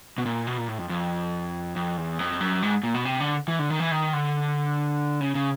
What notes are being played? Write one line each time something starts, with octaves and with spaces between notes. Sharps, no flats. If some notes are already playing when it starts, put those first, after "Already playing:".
B2
A#2
B2
A#2
A2
F2
F2
F2
E2
F2
F#2
G#2
A#2
B2
C3
D3
E3
D3
D#3
E3
D#3
D3
C#3
C#3